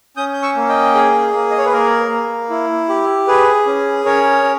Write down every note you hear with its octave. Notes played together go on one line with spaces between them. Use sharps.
C#4 D#6 G6
G6
C#6 E6
A#3
D#5 G5
G#4
A#3
D#5
C#5
B4
A#3 A#4
A#3
E4
G4
G#4 B4
C#4
C#4 A#4 C#5
C#4